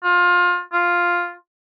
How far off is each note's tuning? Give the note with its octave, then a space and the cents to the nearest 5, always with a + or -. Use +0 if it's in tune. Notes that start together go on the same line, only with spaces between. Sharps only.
F4 +25
F4 +5